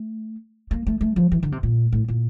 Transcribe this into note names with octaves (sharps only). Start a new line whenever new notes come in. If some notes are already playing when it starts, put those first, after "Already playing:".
Already playing: A3
A#3
A3
A3
F3
E3
D3
C3
A#2
A2
A#2